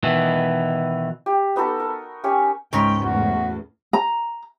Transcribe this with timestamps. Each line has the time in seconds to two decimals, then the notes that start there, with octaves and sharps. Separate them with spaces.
0.03 B2 D#3 E3
1.26 G4
1.56 B3 D#4 F#4 A4
1.80 A#4
2.24 C#4 G4 C#5 G#5
2.73 C#2 G#2 G#3 C#4 A#4 B4 G5
3.04 E2 A2 F#4
3.93 A#5